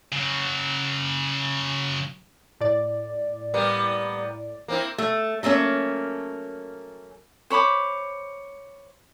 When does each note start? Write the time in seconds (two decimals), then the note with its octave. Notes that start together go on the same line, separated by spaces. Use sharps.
0.12 C#3 F#3
2.61 A2 D5
3.54 G3 A#3 B3
4.68 A#3 C4 E4
4.98 A3
5.43 F#3 A3 A#3 C#4
7.50 C5 C#5 B5 D6